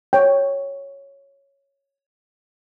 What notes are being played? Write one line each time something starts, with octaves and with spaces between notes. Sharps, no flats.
C#5 G5